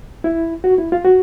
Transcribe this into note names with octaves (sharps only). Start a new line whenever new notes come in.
E4
F#4
E4
F4
F#4